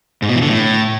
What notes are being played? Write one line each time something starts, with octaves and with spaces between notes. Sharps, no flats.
G#2
B2
E3
D3
A2